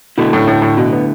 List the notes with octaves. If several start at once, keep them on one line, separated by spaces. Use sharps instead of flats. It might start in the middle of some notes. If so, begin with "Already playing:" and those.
B2 D3 A3 E4
A2
A2
A2
B2
B3